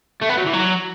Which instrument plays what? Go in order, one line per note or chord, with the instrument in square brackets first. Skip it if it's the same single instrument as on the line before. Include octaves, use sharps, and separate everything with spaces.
[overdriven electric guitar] A3
B3
F#3
E3
F#3